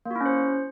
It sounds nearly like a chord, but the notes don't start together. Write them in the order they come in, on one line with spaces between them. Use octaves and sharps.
A#3 F#4 E4 C#4 C5